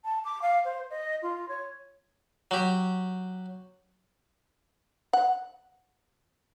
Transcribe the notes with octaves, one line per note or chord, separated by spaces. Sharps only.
A5
D6
F5
C5
D#5
F4
C#5
F#3 G4
F#5